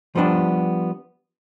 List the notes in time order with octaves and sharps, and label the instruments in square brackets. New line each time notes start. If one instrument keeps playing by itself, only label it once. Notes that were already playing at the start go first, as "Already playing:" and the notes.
[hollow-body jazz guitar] F3 G3 B3 D4 G4